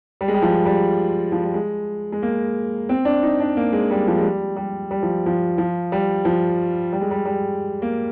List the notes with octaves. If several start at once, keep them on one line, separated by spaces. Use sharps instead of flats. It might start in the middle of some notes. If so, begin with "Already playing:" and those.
G3
G#3
G3
F3
G3
F3
G3
G#3
G#3
A#3
C4
D4
D#4
D4
A#3
G#3
G3
F3
G#3
G3
G3
G3
F3
F3
F3
G3
F3
G3
G#3
G3
G3
A#3